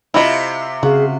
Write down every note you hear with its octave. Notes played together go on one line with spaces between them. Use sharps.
C3 E4 F4 D#5
C#3 C4 F#4 G#4 F5